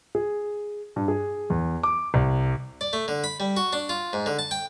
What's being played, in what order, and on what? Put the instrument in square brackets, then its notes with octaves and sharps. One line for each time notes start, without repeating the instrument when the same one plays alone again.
[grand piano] G#4
G2
G#4
E2
D6
C2
[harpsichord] D5
A3
D3
B5
G3
F#4
D4
F4
G#2
D3
A5
G5